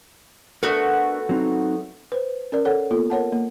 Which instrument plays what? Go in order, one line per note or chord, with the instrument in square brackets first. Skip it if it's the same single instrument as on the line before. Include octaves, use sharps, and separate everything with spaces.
[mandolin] A3 B3 F#4 [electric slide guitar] D4 A4 A#4
[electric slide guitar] F#3 C4 D#4
[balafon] B4 C5
C#4 A#4 D5
A4 C#5 F#5
A#3 B3 F4 A4
A#4 C#5 F#5 A5
A#3